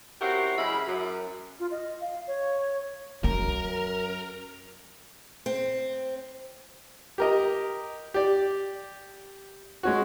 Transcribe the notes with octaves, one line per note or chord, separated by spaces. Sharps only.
C4 C#4 E4 F#4 G4 A#4
C#3 F#3 G#3 E4 B5
F#2
F4
D#5
F5
C#5
F#2 C#4 A#4
C4
G4 A#4 D#5
G4 D5
G#3 C#4 F#4